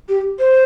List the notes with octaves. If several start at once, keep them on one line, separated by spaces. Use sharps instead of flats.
G4
C5